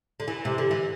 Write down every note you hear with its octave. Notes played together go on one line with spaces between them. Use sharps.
D3
E3
C3
D3
E3